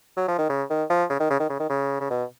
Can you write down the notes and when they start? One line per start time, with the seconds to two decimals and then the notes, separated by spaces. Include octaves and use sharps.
0.17 F#3
0.28 F3
0.38 D#3
0.49 C#3
0.70 D#3
0.90 F3
1.10 C#3
1.20 D#3
1.30 C#3
1.40 D#3
1.50 C#3
1.60 D#3
1.70 C#3
2.00 C#3
2.10 B2